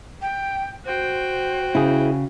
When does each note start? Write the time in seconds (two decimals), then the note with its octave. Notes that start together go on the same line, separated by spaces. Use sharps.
0.22 G5
0.85 F#4 C5 G5
1.75 C#3 E4 G#4